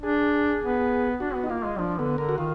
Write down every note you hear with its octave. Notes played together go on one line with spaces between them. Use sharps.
D4 G#4
B3
D4 F#4
B3
D#4
A#3 F4
G#3
F3 D4
D3 B3
D3 A#4
F#4
D#3 F4